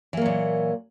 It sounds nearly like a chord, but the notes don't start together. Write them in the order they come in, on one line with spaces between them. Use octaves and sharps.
E3 A#3 F#3 A#2